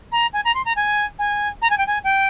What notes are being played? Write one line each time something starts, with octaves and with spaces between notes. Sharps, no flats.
A#5
G#5
A#5
C6
A#5
G#5
G#5
A#5
G#5
G5
G#5
G5